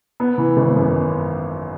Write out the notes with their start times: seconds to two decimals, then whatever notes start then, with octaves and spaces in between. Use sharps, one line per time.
0.20 B3
0.38 E3
0.57 G#1
0.76 F#2